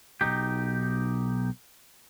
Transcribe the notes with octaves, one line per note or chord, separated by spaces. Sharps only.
B1 F2 D#4 G4